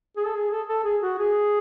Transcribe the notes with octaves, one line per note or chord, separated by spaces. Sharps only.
G#4
A4
G#4
A4
A4
G#4
F#4
G#4